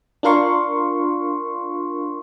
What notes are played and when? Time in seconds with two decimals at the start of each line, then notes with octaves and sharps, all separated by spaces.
0.23 D4 F4 A#4 F5 C6 C#6